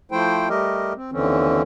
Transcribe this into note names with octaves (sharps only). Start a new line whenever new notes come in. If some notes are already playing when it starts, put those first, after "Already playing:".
F3 A3 E4 C5 G5
G3 A3 G4 A#4 D#5
C4
D#2 D3 E3 C4 C#4